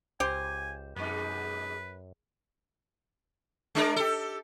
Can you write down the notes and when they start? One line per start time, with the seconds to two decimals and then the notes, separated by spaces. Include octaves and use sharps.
0.20 C#2 G4 C5 G#5
0.96 F#2 B2 G#3 D#4 B4
3.75 G#3 D4 A#4
3.96 G4 A4